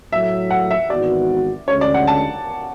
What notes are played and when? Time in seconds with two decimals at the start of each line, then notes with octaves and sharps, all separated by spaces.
0.12 A2 F#3 A3 E5
0.50 F#5
0.71 E5
0.90 G#1 G#2 E3 B3 F#4 D5
1.68 D2 D3 G#3 C#4 C#5
1.81 D5
1.94 F#5
2.07 A5